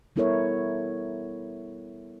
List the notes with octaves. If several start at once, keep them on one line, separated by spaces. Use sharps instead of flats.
G3 B3 E4 A4 A#4 C#5